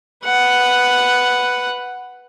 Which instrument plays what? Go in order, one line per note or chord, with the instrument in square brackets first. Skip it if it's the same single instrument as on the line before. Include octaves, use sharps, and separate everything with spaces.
[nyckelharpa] B4 F#5